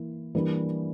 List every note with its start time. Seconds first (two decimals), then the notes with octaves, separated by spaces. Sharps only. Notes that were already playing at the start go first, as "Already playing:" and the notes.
Already playing: E3 A#3 E4
0.35 E3 G3 A#3 D4 A#4